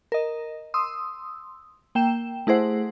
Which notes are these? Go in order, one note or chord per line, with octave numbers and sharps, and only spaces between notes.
A#4 D#5
C6 D#6 E6
A#3 G5 E7
A3 E4 G#4 C5 F#5